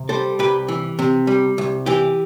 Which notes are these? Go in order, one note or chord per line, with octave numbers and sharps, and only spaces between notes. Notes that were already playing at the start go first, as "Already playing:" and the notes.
Already playing: C3
G3 A4 C5
C2 G4 B4
E3
C3
G3
C2
E3 G4